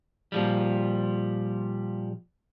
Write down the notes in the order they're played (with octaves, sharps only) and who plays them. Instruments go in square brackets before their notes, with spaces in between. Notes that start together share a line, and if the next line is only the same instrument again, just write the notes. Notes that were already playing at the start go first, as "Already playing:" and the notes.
[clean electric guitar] A#2 F3 G3